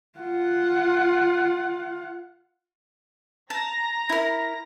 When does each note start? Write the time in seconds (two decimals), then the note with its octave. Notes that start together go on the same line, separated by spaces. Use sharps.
0.19 F4 F#5
3.50 A5 A#5 A#6
4.09 E4 A#4